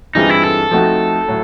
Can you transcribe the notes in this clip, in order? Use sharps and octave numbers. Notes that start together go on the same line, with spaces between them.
G2 E3 G#3 C4 D#4 F4
E4
A4
F3 A3 C4 D#4 F#4
A2 F#3